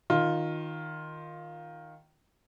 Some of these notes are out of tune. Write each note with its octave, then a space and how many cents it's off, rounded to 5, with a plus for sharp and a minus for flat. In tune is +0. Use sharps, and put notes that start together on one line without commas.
D#3 +0 F4 +10